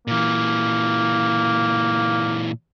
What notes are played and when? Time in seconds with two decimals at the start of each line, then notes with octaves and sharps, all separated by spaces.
0.07 A#2 E3 A#3